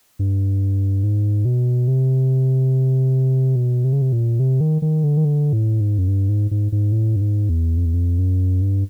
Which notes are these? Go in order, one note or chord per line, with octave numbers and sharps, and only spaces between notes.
G2
G#2
B2
C3
B2
C3
C#3
C3
A#2
C3
D#3
D#3
D3
D#3
D3
A2
G#2
F#2
G2
G#2
G#2
G#2
A2
G2
G#2
E2
F2
E2
F2
F#2
G2